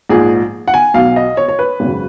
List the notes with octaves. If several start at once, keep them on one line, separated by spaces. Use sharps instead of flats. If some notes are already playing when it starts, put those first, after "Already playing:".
A#1 G#2 F3 G#4
F#5
G#5
B1 B2 F#3 F5
D#5
C#5
C#5
B4
G#1 F#2 C#3